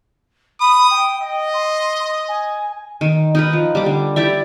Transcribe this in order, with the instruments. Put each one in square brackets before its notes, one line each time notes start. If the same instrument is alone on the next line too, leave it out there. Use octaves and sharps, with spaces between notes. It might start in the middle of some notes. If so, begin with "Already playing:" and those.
[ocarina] B5 [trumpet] D#6
[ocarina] G5
[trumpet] D#5 [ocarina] G5
[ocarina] C6
G#5
[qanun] D#3
D#4 A#4 B4
F3
G3 D6
D3
E4 G4 D5 E5